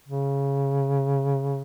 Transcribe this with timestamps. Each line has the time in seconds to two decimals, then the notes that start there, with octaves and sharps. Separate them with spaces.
0.08 C#3